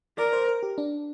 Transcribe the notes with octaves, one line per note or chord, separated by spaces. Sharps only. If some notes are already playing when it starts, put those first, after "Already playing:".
A#4 D5
C5
A#4
G4
D4